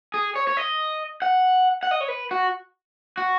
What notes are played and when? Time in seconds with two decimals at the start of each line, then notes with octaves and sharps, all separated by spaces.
0.14 G#4
0.36 C#5
0.47 C#5
0.57 D#5
1.22 F#5
1.83 F#5
1.91 D#5
2.01 C#5
2.08 B4
2.31 F#4
3.17 F#4